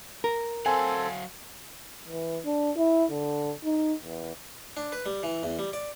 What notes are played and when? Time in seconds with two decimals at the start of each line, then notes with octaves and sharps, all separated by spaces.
0.24 A#4
0.66 F#3 C4 A4 F5 F#5 G#5
2.08 E3
2.45 D4
2.76 E4
3.10 D3
3.65 D#4
4.04 E2
4.77 D4
4.92 B4
5.06 G3
5.23 E3
5.43 E2
5.59 G3
5.73 D5